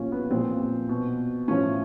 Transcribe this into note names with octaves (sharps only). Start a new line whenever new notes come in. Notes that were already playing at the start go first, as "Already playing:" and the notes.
Already playing: A#2 F3 C#4 F4
B3
A#2 F3 C4
B2
A2 F3 C#4